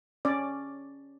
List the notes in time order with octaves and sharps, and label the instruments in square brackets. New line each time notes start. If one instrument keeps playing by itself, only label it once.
[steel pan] C#4 D5